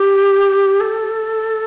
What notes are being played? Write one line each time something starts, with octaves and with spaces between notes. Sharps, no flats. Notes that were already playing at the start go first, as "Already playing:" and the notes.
Already playing: G4
A4